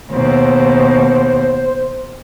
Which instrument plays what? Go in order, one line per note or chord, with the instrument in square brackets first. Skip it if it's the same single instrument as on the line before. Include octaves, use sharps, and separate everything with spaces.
[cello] D#2 B2 [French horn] C5